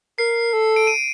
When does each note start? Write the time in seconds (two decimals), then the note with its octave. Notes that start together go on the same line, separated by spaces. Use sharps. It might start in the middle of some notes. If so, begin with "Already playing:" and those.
0.18 A#4 C7
0.53 A4
0.76 D7
0.87 D#7